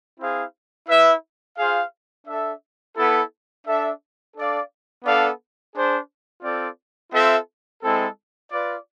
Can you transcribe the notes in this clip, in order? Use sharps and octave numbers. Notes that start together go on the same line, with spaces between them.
C4 E4 G#4 C5 F5
E4 B4 E5
F4 G#4 C5 F5
D4 A4 E5
B3 E4 A4
D4 A4 E5
D4 A4 D5 F5
B3 D4 A4 D5 F5
D4 G#4 C5
C4 F4 A4 D5
C4 F4 A4 E5
G#3 C4 E4 A4
F4 B4 D5